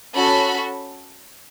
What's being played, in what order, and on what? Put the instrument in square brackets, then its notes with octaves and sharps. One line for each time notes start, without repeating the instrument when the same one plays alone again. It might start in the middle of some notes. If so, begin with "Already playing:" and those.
[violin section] C#4 F#4 A4 B5